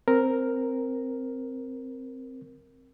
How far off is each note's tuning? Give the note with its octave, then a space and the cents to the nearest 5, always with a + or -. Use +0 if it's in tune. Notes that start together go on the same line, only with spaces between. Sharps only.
C4 +0 A#4 +0